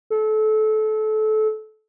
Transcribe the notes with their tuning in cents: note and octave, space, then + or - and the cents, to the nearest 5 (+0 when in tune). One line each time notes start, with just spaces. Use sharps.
A4 -25